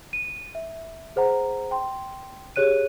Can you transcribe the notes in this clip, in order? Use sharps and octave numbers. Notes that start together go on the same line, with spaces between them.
D#7
E5
G#4 C5 F#5 A#5
G5 C6
G4 G#4 C#5 F#6 D#7